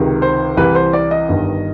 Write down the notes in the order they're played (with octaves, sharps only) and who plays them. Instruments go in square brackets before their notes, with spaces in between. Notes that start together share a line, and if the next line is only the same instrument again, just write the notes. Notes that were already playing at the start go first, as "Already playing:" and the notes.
Already playing: [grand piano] C#2 C3 D#3
C5
C2 C3 E3 B4
C5
D5
D#5
G1 G2 D#3